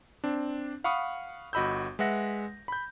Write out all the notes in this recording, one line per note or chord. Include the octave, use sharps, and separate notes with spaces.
C4 D4
F5 F#5 B5 C#6 D#6 F6
G1 F#4 D#5 B5 E6 G6
G#3 B4 E5 F#5 A#6
B5 G6